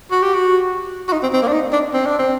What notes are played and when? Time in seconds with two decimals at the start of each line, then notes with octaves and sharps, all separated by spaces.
0.11 F#4
0.22 G4
0.34 F#4
1.08 F#4
1.12 D#4
1.23 C4
1.33 C4
1.42 A#3
1.48 D4
1.53 D#4
1.73 D4
1.94 C4
2.06 D4
2.19 C4